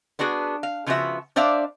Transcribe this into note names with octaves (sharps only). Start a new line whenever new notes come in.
B3 D4 F#4 G#4 B4
F5
C#3 F3 A3 B3 F#4 E5
D4 C5 D5 E5 F5